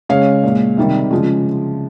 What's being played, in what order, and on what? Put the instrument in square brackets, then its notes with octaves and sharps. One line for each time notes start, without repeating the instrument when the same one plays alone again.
[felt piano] C#3 G#3 C#5 F5
A#2 G#3
C3 D#3 G3
C#3 F3 G#3